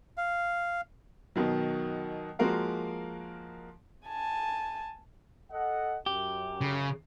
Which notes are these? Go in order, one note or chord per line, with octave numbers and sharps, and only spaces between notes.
F5
B2 D#3 F#3
F3 G#3 A#3 F#4 A#4 F5
G#5 A5
A4 D#5 F#5
F#2 G4
C#3